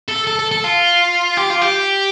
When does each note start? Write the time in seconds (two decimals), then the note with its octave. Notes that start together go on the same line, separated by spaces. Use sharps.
0.08 A4
0.27 A4
0.39 A4
0.51 A4
0.64 F4
1.37 G4
1.50 F4
1.61 G4